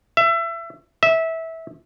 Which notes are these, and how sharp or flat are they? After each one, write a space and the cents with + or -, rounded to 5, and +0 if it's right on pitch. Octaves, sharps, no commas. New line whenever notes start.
E5 +25
E5 -20